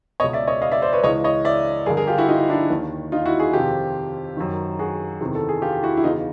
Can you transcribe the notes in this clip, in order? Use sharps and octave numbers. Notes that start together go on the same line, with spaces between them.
C#2 B2 C#5 D#5
D5 E5
C#5 D#5
D#5 F5
D5 E5
C5 D5
B4 C#5
C#2 C#3 E3 C#5 D#5
C#5 D#5
D5 E5
G2 D3 G#4 A#4
G#4 A#4
F4 G4
E4 F#4
D#4 F4
D4 E4
D#2 D#3
D#4 F4
E4 F#4
F#4 G#4
F2 C3 D#3 F4 G4
F#2 D#3
F#4 G#4
E2 C3 D#3
A4
G#4
F4 G4
E4 F#4
E4
E2 C#3 E3 D#4 F4